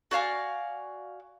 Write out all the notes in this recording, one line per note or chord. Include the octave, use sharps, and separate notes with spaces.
F#4 D5 F5 G#5